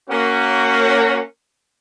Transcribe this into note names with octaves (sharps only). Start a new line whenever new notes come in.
A#3 C#4 F#4